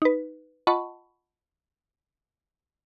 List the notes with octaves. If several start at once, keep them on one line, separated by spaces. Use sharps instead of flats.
D#4 B4
F4 D#5 F#5 A5 B5 C#6